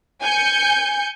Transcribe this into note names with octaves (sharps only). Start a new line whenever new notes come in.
G#5 G6 C#7